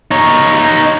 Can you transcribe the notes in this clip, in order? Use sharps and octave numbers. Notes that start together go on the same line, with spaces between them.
D#4 C#5